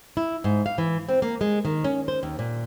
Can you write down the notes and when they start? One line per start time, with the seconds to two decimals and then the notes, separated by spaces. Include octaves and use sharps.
0.17 E4
0.44 G#2
0.66 F5
0.78 E3
1.09 C4
1.22 A#3
1.41 G#3
1.65 D#3
1.84 C#4
2.08 C5
2.23 D#2
2.39 A#2